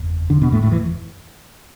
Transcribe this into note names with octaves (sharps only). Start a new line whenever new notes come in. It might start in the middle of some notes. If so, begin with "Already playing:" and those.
Already playing: F#1 E2
D3 D4
B2 B3
A2 A3
A2 A3
E3